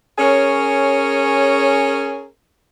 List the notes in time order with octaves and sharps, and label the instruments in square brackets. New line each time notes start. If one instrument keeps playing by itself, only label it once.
[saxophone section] C#4 G#4 A#4 C#5